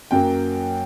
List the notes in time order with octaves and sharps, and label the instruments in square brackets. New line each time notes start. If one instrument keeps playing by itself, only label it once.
[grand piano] F#2 F#3 A#3 G5